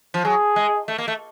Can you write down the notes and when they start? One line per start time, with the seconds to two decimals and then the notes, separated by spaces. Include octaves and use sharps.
0.14 F3
0.25 F#3 G#4
0.56 G#3
0.88 A3
0.98 A#3
1.08 A3